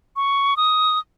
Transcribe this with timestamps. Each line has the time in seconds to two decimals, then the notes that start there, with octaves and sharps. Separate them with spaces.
0.16 C#6
0.57 D#6